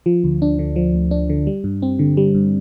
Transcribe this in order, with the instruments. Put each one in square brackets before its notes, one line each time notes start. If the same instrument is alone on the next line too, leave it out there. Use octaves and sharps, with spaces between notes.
[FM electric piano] F3
D2
D4
D3
F3
D2
D4
D3
G3
G2
C4
D3
G3
G2